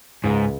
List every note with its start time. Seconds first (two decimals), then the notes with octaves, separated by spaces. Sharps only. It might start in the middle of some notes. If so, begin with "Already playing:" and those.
0.24 C#2 G#2